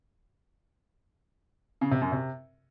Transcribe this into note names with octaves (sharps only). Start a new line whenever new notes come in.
C#3
C3
F#2
C3